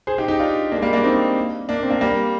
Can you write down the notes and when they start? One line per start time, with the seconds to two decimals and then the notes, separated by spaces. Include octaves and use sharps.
0.07 G#4 C5
0.18 D#4 G4
0.28 D#4 G4
0.39 D4 F4
0.72 A#3 D4
0.77 G#3
0.82 G3 A#3
0.93 A#3 D4
1.04 C4 D#4
1.69 A#3 D4
1.83 C4
1.90 A#3 D4
2.01 G3 A#3